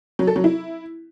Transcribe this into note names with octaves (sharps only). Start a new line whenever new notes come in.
F#3
A4
F#3
E4